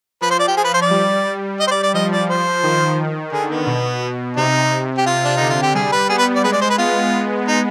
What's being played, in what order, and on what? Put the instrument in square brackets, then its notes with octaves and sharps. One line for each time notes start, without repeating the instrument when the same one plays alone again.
[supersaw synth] F3 [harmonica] B4
[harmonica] C5
D5
G4
[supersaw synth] F3 [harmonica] G#4
[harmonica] B4
C5
D5
[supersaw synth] G3
[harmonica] D#5
C5
D5
D5
[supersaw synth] F3 [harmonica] D#5
[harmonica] D5
C5
[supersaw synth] D#3
[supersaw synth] D3 [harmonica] G#4
[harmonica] B3
[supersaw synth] B2
B2
[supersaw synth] C3 [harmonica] D#4
[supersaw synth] C3
[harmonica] G4
[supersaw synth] C3 [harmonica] F4
[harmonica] D4
[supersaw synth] D3 [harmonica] D#4
[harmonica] F4
G4
[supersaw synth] G3 [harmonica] G#4
[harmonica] B4
[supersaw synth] B3 [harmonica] G#4
[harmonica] B4
D5
[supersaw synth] G#3 [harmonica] B4
[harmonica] D5
C5
B4
[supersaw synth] B3 [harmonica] F4
[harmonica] D#4